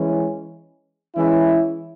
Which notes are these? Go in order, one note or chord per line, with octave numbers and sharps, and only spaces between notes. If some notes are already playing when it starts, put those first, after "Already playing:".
Already playing: E3 G#3 C#4
E3 G#3 C#4 E4